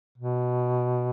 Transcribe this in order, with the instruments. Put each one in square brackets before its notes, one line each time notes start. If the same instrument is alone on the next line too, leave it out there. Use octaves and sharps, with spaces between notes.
[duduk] B2